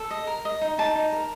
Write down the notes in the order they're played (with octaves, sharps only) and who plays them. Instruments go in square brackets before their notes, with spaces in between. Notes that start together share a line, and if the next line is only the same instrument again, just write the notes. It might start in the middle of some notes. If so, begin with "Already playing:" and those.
Already playing: [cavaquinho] A4
D#5
A#4
D#5
D#4
D#4 A5
D#4
A#4